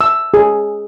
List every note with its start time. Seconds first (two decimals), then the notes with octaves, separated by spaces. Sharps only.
0.01 E6
0.34 G#4